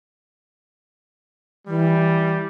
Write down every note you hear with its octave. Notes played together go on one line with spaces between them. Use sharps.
E3 G3